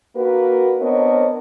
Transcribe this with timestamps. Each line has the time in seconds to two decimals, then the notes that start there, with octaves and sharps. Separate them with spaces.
0.16 A#3 D4 F#4 A#4 B4
0.81 B3 C4 D4 A#4 C#5 D#5